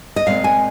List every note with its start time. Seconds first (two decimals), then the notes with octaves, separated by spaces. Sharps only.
0.16 D#5
0.26 A#2 G#3 C4 F5
0.44 G#5